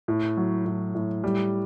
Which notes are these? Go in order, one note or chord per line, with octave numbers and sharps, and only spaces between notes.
A2
F#3
A2
A2
G3